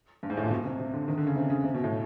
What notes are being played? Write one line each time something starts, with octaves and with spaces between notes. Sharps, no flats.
G2
G#2
A2
A#2
B2
C3
C3
D3
D#3
D3
C#3
C3
C#3
C3
B2
A2